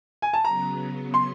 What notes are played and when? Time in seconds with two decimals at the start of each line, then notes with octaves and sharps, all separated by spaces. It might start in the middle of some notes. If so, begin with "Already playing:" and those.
0.22 G#5
0.33 A5
0.44 C#3 F#3 B3 A#5
1.14 C6